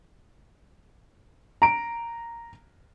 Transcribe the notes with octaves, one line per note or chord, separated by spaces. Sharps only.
A#5 D7